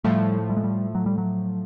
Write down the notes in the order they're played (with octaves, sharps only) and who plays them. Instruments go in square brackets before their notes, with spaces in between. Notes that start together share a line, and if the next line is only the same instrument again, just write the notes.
[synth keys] A2 F3 A3 [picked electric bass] G3
[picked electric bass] G3
G#3
G3
F#3
G3
F#3